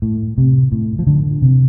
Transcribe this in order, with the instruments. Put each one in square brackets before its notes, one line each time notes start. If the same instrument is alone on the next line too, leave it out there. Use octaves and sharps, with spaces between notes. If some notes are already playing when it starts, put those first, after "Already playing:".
[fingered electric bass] A2
C3
A2
F3
D3
C3